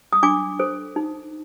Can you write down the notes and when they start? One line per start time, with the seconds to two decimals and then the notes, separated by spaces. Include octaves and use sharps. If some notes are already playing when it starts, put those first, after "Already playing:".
0.13 D#6
0.23 D4 D6
0.59 A4 C5
0.96 D#4